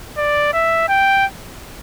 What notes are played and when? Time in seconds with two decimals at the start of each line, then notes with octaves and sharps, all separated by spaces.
0.17 D5
0.53 E5
0.88 G5